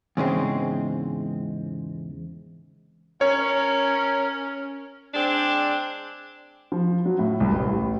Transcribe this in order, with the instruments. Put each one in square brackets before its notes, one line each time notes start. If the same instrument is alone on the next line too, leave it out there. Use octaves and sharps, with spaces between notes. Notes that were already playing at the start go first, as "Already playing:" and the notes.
[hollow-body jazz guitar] E2 G#2 C#3 G#3 C4
[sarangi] C#4 [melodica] A#4 [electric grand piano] C#5
[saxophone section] G#3 C4 D4
[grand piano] F3
F#3
A2
C2
A1